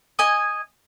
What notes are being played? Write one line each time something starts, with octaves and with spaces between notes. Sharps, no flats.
D#5 G#5